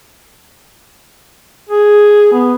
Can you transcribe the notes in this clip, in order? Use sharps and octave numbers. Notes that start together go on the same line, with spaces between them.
G#4
B3